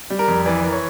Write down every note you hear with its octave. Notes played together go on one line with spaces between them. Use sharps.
G3
A#4
F2
E3 D5
E3 A#4
C#5